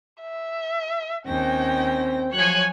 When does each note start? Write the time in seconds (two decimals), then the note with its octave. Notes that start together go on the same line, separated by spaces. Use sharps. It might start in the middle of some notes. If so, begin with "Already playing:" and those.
0.21 E5
1.26 D#2 C4 C#4 G5 A#6
2.33 F3 F#3 C#5 G#5 F#6